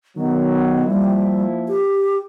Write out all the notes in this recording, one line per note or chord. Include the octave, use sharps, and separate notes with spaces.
D#3 F#3 B3
F3 G3 A#3 E4
G4